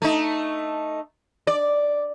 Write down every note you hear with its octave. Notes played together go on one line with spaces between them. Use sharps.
A3 D#4
D5